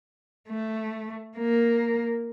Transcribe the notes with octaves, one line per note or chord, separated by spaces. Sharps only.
A3
A#3